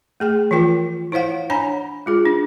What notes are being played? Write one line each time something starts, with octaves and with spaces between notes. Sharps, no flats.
A3 G#4 G5
E3 F3 F4 A#4 G5
E4 C5 C#5 F5 F#5
D4 C#5 F#5 G#5 A#5 B5
G#3 F4 G#4
D4